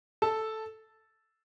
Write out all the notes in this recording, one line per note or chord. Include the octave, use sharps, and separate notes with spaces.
A4 A5